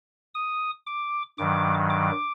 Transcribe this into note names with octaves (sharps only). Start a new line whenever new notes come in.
D#6
D6
G2 D#3 F#3 D6
D6